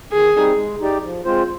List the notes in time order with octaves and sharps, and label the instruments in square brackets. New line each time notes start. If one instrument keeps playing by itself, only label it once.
[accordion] D#3 [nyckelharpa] G#4
[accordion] G3 C4 D#4
G#3
D#4 G4 D5
F3
G#3 C4 F4 C5